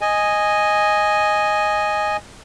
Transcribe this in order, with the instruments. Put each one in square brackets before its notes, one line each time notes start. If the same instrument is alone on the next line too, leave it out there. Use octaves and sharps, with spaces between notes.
[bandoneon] D#5 G#5